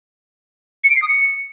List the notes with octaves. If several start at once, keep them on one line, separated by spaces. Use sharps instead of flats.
C#7
D7
C7
D#6
C#7